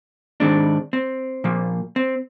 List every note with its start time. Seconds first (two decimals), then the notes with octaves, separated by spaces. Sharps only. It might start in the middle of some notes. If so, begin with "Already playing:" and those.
0.40 G#2 D#3 G#3 C4 D4
0.93 C4
1.44 A#2 F3 A#3
1.96 C4